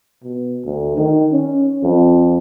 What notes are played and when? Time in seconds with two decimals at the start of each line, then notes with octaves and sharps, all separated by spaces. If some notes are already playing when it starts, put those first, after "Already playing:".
0.23 B2
0.65 D2
0.97 D#3
1.32 C#4
1.83 F2